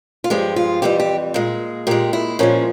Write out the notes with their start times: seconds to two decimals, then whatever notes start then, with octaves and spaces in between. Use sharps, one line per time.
0.24 F4
0.30 G2 F3 G#3 G4
0.56 F4
0.82 F2 E3 G3 G4
1.00 G4
1.34 A#2 G#3
1.87 A#2 G#3 G4
2.13 E4
2.39 A#2 F3 G#3 C#4